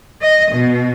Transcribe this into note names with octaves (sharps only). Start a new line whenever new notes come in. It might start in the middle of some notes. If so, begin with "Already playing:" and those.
D#5
B2